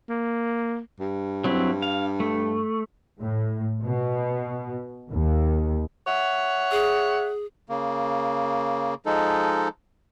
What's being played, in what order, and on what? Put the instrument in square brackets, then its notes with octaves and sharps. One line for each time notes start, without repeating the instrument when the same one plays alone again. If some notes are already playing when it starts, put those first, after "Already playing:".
[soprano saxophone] A#3
[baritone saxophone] G2
[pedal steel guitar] F#3 C4 E4
F5
A3
[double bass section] A2
B2
D#2
[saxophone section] C#5 E5 F#5
[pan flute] G#4
[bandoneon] C#3 A#3
F3 G#3 D#4 A4